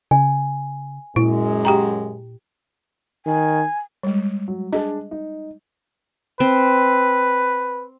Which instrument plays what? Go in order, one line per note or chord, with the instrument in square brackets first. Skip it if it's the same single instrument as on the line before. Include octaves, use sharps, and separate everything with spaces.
[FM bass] C#3 [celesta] G#5
[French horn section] F#2 G#3 [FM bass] A#2 [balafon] E4
[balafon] G4 G5 A#5
[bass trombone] D#3 [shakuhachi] G#5
[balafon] G3 G#3
[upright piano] F#3
[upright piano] D4 G#4 A5 [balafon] D#5
[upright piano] D#4
[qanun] C4 [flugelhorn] B4